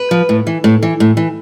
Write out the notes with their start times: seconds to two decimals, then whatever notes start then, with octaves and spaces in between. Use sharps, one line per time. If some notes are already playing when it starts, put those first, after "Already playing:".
Already playing: B4
0.11 F3
0.29 A2
0.47 E3
0.64 A2
0.83 E3
1.00 A2
1.17 E3